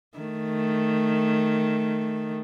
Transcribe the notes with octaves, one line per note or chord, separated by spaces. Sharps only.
D#3 A3